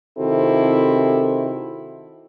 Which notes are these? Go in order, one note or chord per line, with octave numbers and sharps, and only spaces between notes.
C3 D#3 C4 E4 F#4 A4